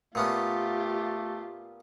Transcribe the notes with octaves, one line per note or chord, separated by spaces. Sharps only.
A#2 A3 B3 C#4 F4 G4